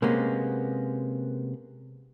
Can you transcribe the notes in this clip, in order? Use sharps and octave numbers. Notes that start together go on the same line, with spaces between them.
C3 G#3 A#3 B3 C#4